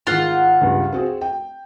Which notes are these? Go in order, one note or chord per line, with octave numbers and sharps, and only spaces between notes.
G#2 D#3 F4 F#5
C#2 G2
C4 F#4 G#4
G5